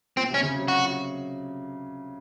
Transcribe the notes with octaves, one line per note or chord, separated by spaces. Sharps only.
A#2 C4
C3
C#4
C#3
F#3
F#4